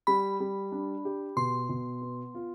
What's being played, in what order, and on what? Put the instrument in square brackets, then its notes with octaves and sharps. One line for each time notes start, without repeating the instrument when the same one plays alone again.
[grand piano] G3 [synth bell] B5
[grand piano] G3
D4
G4
[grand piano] B2 [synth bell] C6
[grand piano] B2
B3
F4